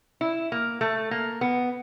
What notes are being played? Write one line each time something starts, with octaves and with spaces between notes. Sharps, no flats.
E4
A#3
A3
A#3
B3